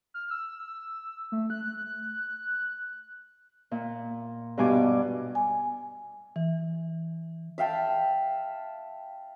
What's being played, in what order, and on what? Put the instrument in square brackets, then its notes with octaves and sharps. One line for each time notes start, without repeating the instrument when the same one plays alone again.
[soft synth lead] F6
E6
A3
F#6
[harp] A#2
G2 B2 G#5 D6
[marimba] G#5
E3
[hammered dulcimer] E5 F5 G5 A5